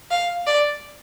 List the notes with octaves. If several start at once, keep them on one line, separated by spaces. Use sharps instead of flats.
F5
D5